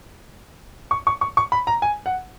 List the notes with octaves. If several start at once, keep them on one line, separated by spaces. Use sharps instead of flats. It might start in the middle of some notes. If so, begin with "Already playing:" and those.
C#6
C#6
C#6
C#6
B5
A#5
G#5
F#5